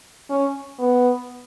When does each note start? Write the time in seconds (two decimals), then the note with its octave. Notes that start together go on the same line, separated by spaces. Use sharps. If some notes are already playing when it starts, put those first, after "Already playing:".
0.30 C#4
0.79 B3